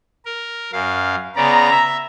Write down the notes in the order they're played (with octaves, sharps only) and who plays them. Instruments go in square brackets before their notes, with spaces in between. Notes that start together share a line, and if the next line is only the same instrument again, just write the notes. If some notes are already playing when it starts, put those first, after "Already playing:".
[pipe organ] A#4
F#2 F5
[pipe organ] C#3 B3 D5 [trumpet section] A#5
[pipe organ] E5